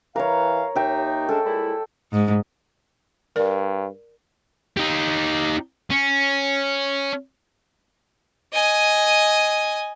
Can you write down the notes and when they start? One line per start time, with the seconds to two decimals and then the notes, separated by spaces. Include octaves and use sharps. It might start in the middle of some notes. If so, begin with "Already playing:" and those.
0.16 E3 A#4 C#5 F5
0.76 D#2 D#4 E5 G5
1.29 G#3 C#4 D4 A4
1.45 A#2 G#3 E4
2.12 G#2
3.36 G2 A#4 D5
4.77 D#4 G4
5.91 C#4
8.53 D#5 G#5